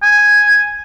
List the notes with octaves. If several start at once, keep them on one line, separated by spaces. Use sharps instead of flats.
G#5